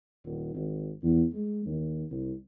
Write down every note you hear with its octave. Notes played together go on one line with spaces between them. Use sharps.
D#1
G#1
E2
G#3
D#2
C2